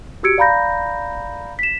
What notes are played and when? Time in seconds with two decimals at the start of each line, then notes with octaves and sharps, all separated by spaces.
0.23 F#4 G4 E6 G#6 C#7 D7
0.38 D5 F5 A#5 B5 G6 A#6
1.59 B6 E7